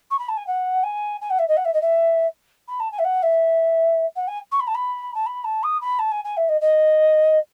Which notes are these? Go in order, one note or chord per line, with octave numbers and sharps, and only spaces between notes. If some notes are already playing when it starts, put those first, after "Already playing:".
C#6
B5
A5
G#5
F#5
G#5
G#5
F#5
E5
D#5
F#5
E5
D#5
E5
B5
A5
G#5
E5
F#5
E5
F#5
G#5
C#6
B5
A5
B5
A5
B5
A5
D#6
B5
A5
G#5
G#5
E5
D#5
D#5